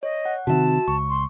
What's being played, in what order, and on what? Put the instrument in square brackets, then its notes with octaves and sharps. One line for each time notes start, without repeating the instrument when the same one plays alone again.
[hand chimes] C#5 [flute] D#5
[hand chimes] F#5
[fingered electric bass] C3 D#3 C4 [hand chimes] F#4 E5 [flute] A5
[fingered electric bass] C#2 [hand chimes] C#6
[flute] C6